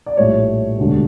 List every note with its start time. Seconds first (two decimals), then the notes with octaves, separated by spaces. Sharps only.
0.06 D5
0.17 A#1 A2 G3 C#5
0.78 E1 D2 D3 G3